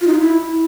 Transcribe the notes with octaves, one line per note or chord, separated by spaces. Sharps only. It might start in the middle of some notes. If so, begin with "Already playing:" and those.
F4
D#4
F4
E4